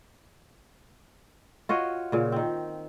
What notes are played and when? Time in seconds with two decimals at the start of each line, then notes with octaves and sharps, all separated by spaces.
1.69 F4 F#4 C#5 D#5
2.12 A#2 C#3
2.32 D#3 C4